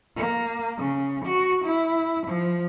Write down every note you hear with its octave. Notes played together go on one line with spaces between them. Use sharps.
A#3
C#3
F#4
E4
F3